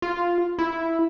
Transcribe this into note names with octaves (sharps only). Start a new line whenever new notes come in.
F4
E4